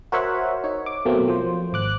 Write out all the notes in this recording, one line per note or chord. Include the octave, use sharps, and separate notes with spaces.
F#4 A#4 C5 C#5 E5 F#5
D#4 C#5
D6
B2 F#3 A3 A#3 C4
F3 C5
G#1 D6 F#6